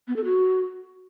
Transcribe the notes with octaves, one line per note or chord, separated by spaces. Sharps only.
B3
A4
F#4